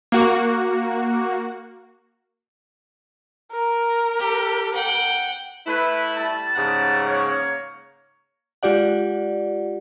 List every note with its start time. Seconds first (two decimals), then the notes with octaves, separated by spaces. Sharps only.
0.12 A#3 F#4
3.52 A#4
4.19 G4
4.75 F#5 G5
5.67 A3 E4 B4
6.17 G3 E5 A5
6.56 G#2 C#3 F#5
7.05 A#3 C#5
8.63 G#3 F4 G4 D5 F#5